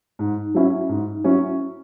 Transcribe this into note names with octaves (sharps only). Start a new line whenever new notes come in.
G#2
F#3 C#4 E4
G#2
F#3 C#4 E4